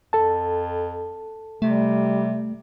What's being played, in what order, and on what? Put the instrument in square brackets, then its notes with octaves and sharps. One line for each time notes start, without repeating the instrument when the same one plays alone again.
[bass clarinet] F2 [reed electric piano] A4 A5
[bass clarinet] C3 [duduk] G3 [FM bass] A3